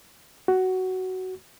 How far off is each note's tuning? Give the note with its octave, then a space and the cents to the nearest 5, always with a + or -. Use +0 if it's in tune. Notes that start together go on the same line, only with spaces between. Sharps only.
F#4 +10